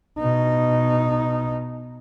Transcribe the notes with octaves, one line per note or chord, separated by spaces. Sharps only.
B2 D#4